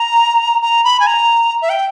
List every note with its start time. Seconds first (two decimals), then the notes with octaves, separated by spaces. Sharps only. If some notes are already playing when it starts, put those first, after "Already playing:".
Already playing: A#5
0.62 A#5
0.84 B5
1.00 G#5
1.07 A#5
1.62 E5
1.69 G5